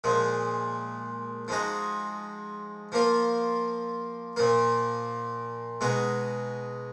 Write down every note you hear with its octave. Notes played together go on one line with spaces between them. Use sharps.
A#2 F3 G#3
F3 G#3 D#4 F#4
F3 A#3 F4
A#2 F3 A#3
B2 G#3 D#4 F#4